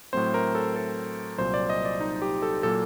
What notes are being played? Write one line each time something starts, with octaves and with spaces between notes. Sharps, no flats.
A2 F#3 A3 C4 C5
A#4
A4
A4
C2 A#2 F#3 C5
D5
D#5
D5
D#4
G4
A4
A#2 F#3 A#3 A4